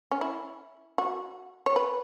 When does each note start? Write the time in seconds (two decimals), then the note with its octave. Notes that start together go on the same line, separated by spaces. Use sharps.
0.11 C#4
0.21 E4
0.98 F#4
1.66 C#5
1.76 B4